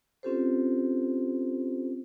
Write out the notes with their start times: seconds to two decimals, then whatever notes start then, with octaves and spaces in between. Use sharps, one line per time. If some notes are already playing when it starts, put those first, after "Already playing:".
0.23 C4 C#4 F4 G4 A4 C5